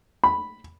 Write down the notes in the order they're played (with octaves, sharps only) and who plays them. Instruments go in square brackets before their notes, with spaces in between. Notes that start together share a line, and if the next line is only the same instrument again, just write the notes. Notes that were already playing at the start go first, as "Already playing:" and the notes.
[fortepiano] B5